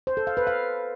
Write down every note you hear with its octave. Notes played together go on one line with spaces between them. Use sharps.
C5
A4
F5
B4
F5